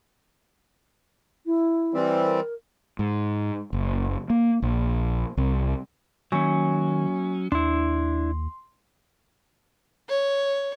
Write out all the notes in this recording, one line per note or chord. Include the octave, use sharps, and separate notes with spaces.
E4
E3 G3 C4
A#4
G#2
F#1
A#3
A#1
C2
D#3 F#3 A#3 C#4 G#5 C#6
D#2 D4 E4 C6
C#5